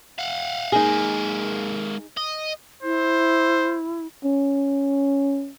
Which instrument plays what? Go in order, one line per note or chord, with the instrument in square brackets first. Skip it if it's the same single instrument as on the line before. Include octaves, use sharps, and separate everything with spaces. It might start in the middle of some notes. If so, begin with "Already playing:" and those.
[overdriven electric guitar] F5 F#5
[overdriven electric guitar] G#3 A#3 [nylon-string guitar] D#4 G#4
[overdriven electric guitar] D#5
[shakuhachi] E4 [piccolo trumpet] C5
[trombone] C#4